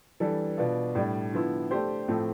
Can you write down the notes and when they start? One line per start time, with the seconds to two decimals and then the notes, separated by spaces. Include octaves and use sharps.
0.20 E3 G3 D4 A4
0.58 B2 B3 D4 F4
0.95 A2 G3 D4
1.32 D3 F3 B3 E4
1.71 A3 D4 G4 C5
2.08 A2 F3 A3 C4